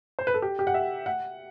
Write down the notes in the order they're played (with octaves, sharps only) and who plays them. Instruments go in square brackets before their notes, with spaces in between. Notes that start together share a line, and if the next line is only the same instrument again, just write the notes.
[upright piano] C5
B4
A4
G4
G4
F#5
E5
F#5